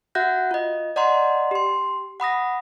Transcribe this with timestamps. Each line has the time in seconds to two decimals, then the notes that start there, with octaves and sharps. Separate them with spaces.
0.15 F#4 E5 F#5 F#6 G6 A#6
0.51 F4 D#5
0.96 D5 D#5 F#5 A#5 C6
1.51 G4 C6
2.20 F#5 B5 D#6 A#6